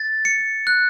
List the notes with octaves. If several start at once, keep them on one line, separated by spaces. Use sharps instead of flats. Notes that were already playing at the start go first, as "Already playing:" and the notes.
Already playing: A6
C#7
F#6